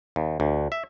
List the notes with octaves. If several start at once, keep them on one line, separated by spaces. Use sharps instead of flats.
D#2
D2
E5